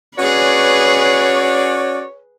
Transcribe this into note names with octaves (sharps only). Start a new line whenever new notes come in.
C#4 F#4 G#4 B4 C#5 D5